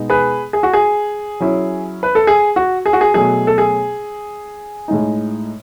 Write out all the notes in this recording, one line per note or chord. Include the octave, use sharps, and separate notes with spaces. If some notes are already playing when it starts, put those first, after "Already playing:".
Already playing: B2 G#3 B3 D#4
G#4 B4
G#4
F#4
G#4
F#3 C#4 E4
B4
A4
G#4
F#4
G#4
F#4
G#4
B2 F#3 A3 G#4
A4
G#4
A2 G#3 D#4